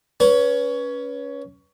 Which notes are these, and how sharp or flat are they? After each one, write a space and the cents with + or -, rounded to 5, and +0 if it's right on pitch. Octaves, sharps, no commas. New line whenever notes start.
C#4 +15 B4 -15